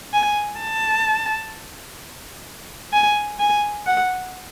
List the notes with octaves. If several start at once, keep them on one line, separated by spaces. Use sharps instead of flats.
G#5
A5
G#5
G#5
F#5